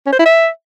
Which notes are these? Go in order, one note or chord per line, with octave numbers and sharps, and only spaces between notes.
C#4
C5
E4
E5